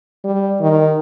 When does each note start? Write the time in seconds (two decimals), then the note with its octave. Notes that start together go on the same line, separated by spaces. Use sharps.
0.24 G3
0.61 D#3